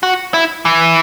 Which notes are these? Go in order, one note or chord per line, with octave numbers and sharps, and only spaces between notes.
F#4
E4
E3